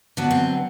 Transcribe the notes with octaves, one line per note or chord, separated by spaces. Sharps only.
D3 F#3 B3
C4